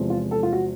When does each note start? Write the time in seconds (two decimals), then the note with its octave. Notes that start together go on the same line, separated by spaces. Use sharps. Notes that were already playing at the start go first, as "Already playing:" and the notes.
Already playing: E2 C3 F3 G#3
0.10 F4
0.31 A4
0.43 F4
0.53 F#4